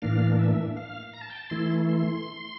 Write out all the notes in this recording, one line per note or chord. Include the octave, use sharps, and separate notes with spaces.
A2 E3 A#3 D4 F5
E5
F5
A#5
A5
G5
A5
E3 A3 E4 C6
C6